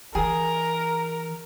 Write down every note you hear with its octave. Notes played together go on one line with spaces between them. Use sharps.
E3 G#4 A#4